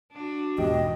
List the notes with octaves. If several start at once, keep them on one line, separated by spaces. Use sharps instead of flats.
D4 F#4
E2 G#2 B2 G4 D#5